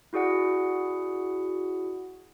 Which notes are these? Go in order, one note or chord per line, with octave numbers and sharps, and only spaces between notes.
E4 F#4 G#4 D5 F#5